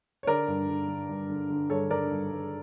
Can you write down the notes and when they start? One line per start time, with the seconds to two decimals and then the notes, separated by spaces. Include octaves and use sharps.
0.23 C#5
0.27 D3 A#4 D5
0.48 G2
0.68 D3
0.88 D3
1.09 G2
1.30 D3
1.50 D3
1.70 G2 A4 C#5
1.90 D3 A#4 D5
2.11 G2
2.31 G2